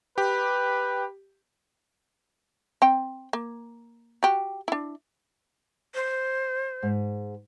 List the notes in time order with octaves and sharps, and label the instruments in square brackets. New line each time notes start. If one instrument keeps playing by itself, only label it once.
[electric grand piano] G4 [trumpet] B4
[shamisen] C4 G5
A#3
F#4 G4
D4 E4
[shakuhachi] C5
[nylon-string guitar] G#2